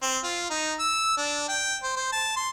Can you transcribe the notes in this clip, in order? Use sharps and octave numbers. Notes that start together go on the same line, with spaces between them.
C4
F4
D#4
E6
D4
G5
C5
C5
A5
C6